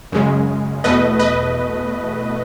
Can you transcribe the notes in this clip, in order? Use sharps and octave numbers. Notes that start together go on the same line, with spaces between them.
F#2 C#3 G#3
E2 B2 A3 B4 D#5
B4 D#5